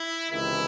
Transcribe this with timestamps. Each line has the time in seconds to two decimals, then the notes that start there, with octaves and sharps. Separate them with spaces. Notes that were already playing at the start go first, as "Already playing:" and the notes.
Already playing: E4
0.30 C#2 C3 D#3 E3 E4